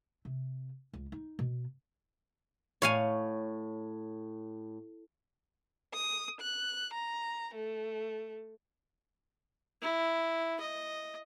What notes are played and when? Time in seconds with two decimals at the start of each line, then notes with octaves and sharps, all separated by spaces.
0.25 C3
0.93 C#2
1.12 D#4
1.39 B2
2.82 A2 C#5 F5 G#5
5.94 D#6
6.41 F#6
6.94 A#5
7.55 A3
9.82 E4
10.60 D#5